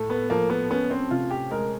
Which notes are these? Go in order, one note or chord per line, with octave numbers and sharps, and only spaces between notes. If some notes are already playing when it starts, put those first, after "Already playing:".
Already playing: A2 A3
B3
F3 A#3
B3
B3 C#4
C4
C3 F4
G4
G#3 A#4